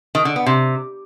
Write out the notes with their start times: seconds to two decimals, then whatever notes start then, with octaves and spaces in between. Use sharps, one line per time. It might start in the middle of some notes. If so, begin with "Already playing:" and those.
0.15 D#3
0.25 D3
0.36 B3
0.46 C3